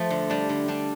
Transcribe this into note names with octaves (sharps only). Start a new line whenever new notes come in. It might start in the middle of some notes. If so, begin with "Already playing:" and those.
Already playing: F3 A3
D3
G3 D4
D3
G3 D4